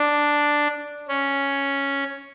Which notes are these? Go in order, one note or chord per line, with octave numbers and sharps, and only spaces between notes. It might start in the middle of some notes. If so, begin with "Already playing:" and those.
Already playing: D4
C#4